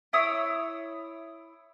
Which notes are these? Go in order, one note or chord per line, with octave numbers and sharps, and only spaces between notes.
E4 C#5 D#6 E6